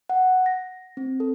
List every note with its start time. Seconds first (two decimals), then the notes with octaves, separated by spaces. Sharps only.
0.10 F#5
0.46 A#6
0.97 C4
1.20 A4